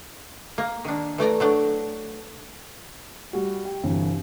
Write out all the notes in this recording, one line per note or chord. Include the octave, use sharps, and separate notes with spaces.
A#3
D#3 D4
E3 A3 D5 A#5
F#3 A3 D4
G3 F#4
G5
G1 C3 E3